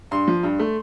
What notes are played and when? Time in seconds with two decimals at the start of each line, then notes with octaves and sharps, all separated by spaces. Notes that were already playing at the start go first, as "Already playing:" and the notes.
0.11 G2 C6
0.28 F3
0.43 G2
0.59 A3